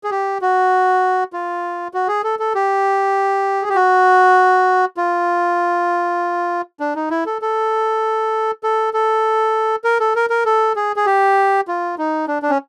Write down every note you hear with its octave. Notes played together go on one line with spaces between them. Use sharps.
G#4
G4
F#4
F4
F#4
G#4
A4
A4
G4
G#4
G4
F#4
F4
D4
D#4
E4
A4
A4
A4
A4
A#4
A4
A#4
A#4
A4
G#4
G#4
G4
F4
D#4
D4
D4
C#4